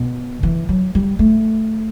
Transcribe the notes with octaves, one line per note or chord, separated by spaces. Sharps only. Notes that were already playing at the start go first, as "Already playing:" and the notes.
Already playing: B2
E3
F#3
G3
A3